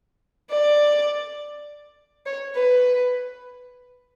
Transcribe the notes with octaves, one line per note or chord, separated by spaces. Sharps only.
D5
C#5
B4